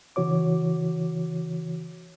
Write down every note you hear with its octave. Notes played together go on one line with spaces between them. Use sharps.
C#3 E3 F#4 C#5 D6